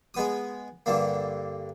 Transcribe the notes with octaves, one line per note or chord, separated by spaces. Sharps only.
G#3 B3 D#6
G2 D3 A#3